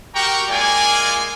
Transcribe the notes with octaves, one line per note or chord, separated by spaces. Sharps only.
F#4 G4 A#4 G5 A#5 C#6
G#3 A#3 F4 D5 G#5